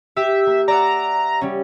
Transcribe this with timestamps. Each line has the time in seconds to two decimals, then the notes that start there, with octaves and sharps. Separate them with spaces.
0.16 G4 E5
0.47 A#3
0.68 D5 E5 F#5 A#5
1.41 G3 C#4